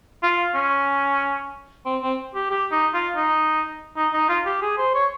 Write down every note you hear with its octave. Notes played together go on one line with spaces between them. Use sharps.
F4
C#4
C4
C4
G4
G4
D#4
F4
D#4
D#4
D#4
F4
G4
G#4
C5
C#5